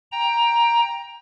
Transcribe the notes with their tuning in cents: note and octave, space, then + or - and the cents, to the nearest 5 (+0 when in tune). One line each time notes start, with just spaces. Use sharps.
G5 +15 A#5 +10